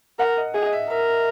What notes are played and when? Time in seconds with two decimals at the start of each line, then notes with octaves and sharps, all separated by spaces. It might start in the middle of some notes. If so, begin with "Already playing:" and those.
0.19 A#4 F#5
0.37 D#5
0.54 G#4 D#5
0.66 D#5
0.73 E5
0.90 A#4 E5